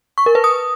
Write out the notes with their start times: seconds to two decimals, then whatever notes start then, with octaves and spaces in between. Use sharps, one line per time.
0.18 C#6
0.26 A#4
0.35 B4
0.44 D#6